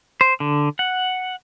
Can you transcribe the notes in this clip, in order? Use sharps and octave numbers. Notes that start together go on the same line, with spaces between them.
C5
D3
F#5